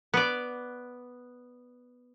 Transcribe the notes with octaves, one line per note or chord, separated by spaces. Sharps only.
B3 D5